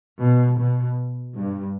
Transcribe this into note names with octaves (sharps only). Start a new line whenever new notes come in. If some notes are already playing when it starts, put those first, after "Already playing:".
B2
B2
G2